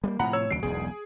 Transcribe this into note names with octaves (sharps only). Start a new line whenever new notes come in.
G3 A3 A#3
A2 C3 F3 F#5 A#5 B5
C#5 E6
D2 C#3 F#3 C7 D7
E1 B1 E2 G#4